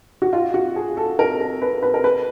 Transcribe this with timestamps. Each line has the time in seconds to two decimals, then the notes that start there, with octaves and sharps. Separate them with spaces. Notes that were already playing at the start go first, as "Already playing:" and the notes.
0.22 F#4
0.33 F4
0.54 F#4
0.76 G#4
0.97 A4
1.19 A#4
1.41 A#4
1.62 B4
1.83 B4
1.94 A#4
2.04 B4